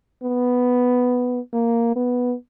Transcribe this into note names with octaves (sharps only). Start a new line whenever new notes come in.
B3
A#3
B3